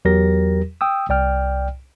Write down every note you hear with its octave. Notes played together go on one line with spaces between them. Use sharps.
E2 F#3 G4 A#4 A#6
G5 D#6 E6
C2 D5 G5 F6